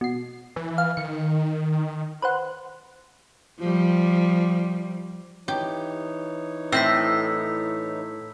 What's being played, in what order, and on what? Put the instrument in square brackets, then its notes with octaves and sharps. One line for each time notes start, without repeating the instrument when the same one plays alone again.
[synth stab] B2 C7
[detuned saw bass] E3
[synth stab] F5
[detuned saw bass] D#3 [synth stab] C#7
[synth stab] B4 C5 F#5
[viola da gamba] F3 G3
[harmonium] E3 D#4 C#5 [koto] G4
[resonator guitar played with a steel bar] A2 [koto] C4 [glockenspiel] E6 G6 B6